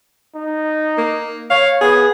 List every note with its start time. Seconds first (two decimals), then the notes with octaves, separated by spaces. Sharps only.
0.36 D#4
0.98 A#3
1.50 C#5 F5
1.81 B3 G#4